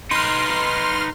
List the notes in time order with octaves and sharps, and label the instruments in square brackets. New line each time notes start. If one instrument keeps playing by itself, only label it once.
[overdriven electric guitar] D#4 B4 [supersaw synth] C6 F6